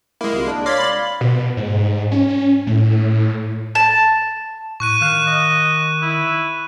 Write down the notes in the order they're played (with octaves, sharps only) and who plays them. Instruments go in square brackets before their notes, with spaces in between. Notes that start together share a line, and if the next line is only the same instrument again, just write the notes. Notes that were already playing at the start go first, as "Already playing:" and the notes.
[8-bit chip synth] G#3 A#3 [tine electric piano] E4
[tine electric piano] C2 C3 F4
D4
[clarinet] C#5 [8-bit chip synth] D5 F5 C6 [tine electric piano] A#6 B6
[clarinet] B5
[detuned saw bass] B2
G#2
C#4
A2
[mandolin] A5
[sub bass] A2 [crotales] C#6 F#6 D#7
[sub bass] D#3 [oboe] F5 [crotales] F#6 E7
[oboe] D#5
E4